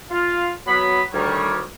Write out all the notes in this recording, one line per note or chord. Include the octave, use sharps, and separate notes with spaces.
F4
F#3 B3 B5
D2 D#3 G3 C#5